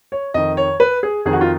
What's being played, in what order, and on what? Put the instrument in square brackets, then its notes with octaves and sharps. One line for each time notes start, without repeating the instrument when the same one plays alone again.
[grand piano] C#5
F2 D#3 D#5
C#5
B4
G#4
F2 D#3 G#4
F#4
F4